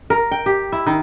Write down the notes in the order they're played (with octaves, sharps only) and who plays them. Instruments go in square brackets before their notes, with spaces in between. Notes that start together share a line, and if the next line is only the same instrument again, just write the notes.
[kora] A#4
G5
G4
E4
D#3